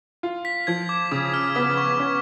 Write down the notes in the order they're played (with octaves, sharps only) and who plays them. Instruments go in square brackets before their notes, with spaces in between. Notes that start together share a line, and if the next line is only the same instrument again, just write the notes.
[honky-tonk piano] F4
[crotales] B6
[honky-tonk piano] F3 [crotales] G#6
[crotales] D6
[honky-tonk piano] C#3 [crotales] D6
[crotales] F6
[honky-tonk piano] B3 [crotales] D6
[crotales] C#6
[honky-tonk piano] C#4